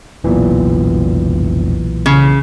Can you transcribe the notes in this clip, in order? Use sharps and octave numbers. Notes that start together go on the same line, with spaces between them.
F1 B1 A#2 E3 B3
C#3